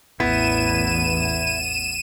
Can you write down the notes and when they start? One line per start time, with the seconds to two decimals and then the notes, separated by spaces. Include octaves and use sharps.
0.20 A1 E2 B3 E4 D#7 E7